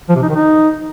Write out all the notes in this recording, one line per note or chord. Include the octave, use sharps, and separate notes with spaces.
F3
C3
D#4
D#3
D#4